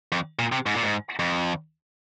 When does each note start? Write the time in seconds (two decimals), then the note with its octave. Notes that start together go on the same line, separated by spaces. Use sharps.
0.12 F2
0.39 A#2
0.52 C3
0.66 G#2
0.74 A#2
0.83 G#2
1.19 F2